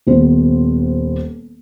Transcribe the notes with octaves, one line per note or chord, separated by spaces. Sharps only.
D#1 B3 C5